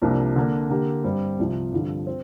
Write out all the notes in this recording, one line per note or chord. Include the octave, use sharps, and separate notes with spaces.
C2 C3 F3 A#3 D4
D3 A#3 D4
D3 A#3 G4
G2 G3 C4
C2 C3 F3
G2 D3 F3
C4